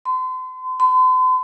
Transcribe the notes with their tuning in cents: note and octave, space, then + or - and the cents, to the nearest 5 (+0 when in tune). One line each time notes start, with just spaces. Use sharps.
C6 -40
C6 -45